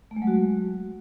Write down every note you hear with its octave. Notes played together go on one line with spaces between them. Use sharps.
A3
G#3
F#3
F#4